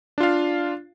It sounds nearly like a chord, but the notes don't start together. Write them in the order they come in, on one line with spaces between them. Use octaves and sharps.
D4 F4 F5